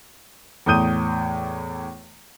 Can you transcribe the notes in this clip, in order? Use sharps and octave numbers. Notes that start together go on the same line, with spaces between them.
E2 A2 D#6 G6 D#7